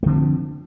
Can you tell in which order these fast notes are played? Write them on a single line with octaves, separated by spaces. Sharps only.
A3 D3 C4 F3